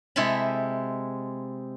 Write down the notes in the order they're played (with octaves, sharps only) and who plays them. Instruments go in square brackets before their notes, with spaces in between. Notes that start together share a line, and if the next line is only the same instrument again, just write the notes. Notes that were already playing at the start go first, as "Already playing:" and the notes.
[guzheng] C3 G#3 E4 A4 A5 B5